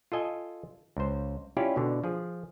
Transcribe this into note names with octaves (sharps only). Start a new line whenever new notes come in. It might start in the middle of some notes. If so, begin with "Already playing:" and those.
F4 A4 D#5 G#5
C#2 C5
C#4 E4 F4 G4 D5
B2 D3
F3 G#4